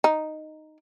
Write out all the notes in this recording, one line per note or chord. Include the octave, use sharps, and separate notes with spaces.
D#4